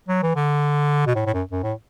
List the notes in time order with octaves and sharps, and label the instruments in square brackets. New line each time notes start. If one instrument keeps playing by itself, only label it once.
[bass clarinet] F#3
E3
D3
B2
A2
A2
F#2
F#2
A2